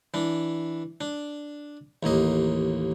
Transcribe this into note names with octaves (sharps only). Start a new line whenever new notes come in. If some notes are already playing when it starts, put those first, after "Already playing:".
E3 D4
D4
A1 D#2 A#3 D#5